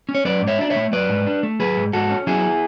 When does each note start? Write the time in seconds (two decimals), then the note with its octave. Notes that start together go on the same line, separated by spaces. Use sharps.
0.09 C#4
0.15 C#5
0.25 F#3 B4 D5
0.42 G#2
0.48 C#5 E5
0.59 D4 D5
0.70 C#5 E5
0.76 A3
0.93 F#3 B4 D5
1.09 G#2
1.27 D4
1.43 A3
1.60 F#3 G#4 B4
1.77 G#2
1.93 G#2 F#4 A4
2.11 C#4
2.27 F#3 E4 G#4